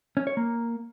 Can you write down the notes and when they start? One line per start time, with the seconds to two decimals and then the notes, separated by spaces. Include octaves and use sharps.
0.17 C#4
0.27 C#5
0.37 A#3